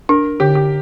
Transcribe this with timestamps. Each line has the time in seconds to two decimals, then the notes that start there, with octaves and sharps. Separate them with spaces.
0.09 D4 A#4
0.40 D3 G4
0.55 G4